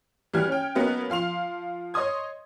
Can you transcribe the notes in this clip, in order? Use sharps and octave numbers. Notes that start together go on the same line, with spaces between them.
E3 G3 F#4 F6 G#6
C#4 G5
F#3 A#3 B3 C#4 D#4 F#4
F3 F5 C6 F7
C#5 D#5 C6 D#6 G#6